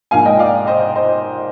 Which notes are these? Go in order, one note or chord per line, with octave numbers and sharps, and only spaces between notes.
G#2 F3 A#3 F5 G#5
D#5 G5
D5 F5
C5 D#5
C5 D#5